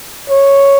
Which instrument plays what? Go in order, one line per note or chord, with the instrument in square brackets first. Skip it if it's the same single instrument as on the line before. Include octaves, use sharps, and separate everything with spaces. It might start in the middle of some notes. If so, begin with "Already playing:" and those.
[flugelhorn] C#5